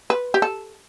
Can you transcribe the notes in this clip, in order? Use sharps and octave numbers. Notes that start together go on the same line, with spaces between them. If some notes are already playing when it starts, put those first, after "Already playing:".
B4
G4
A4